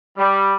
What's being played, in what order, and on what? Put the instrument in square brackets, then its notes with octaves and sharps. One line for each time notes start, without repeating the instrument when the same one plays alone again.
[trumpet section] G3